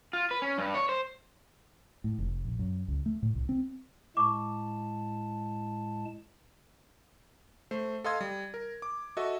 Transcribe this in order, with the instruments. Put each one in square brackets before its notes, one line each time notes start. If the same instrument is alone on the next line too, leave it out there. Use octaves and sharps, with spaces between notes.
[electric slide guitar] F4
B4
C#4
G2
C#5
C5
[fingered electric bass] A2
F1
A#1
F#2
C#2
A3
A2
C2
C4
[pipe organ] A2 G#3 A5 [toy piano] C#6 D6
[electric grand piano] A3 C5
A4 D#5 F5 C6 D#6 G#6
G3
A#4
D6
F#4 A4 D#5 E5